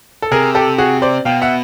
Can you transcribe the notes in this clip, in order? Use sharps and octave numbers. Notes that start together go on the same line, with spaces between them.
A4
C3 G#4 A#4
G4 A4
F#4 G#4
C5 D5
B2 F5 G5
E5 F#5